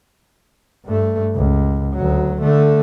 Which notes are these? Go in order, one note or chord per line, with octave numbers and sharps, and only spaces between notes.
G2 A3
C#2
D2 F#3
D3 A3